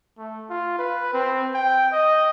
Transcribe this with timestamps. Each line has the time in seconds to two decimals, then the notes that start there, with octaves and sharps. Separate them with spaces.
0.18 A3
0.50 F4
0.79 B4
1.14 C4
1.54 G5
1.92 D#5